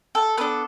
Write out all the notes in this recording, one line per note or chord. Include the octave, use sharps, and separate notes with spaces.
A4
B3 D4 A4 B4